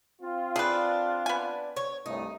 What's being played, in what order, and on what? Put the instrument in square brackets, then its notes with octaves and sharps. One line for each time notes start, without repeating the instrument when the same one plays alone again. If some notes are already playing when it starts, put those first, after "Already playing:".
[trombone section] C4 F4
[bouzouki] D4 [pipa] G#4 B4
[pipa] B3 G#5
[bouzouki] C#5
[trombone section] C2 G2 A3 [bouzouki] D#4